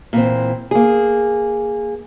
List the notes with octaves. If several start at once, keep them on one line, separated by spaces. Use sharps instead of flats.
A#2 E3 C4
A#3 G#4